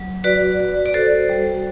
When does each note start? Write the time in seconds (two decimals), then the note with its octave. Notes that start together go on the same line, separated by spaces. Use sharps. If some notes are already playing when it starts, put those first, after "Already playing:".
Already playing: F#3
0.24 F#4 B4 D5
0.60 F#4
0.86 D5
0.94 F#4 A4 C5
1.29 G3